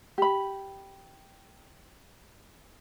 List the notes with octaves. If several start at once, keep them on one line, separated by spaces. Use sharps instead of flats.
G4 B5